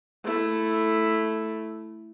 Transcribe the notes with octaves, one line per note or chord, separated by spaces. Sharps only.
A3 E4